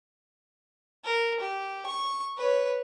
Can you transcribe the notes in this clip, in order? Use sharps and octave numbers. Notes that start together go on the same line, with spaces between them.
A#4
G4
C#6
B4 C#5